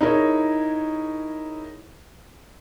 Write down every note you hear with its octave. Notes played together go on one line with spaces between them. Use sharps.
D#4 E4 G#4 A#4 C#5